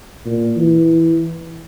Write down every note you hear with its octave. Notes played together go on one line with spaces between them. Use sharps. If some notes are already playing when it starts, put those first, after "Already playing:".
A#2
E3